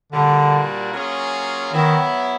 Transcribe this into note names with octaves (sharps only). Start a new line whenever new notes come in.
A#2 D3 G3 A#3 D4 F#4
F#3 A#3 C#4 F4 G#4
D#3 F#3 B3 E4